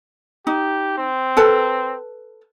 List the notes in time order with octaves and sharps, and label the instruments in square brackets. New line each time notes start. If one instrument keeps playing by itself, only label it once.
[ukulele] D#4 [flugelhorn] G4
[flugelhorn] C4
[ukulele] A4 B4 A5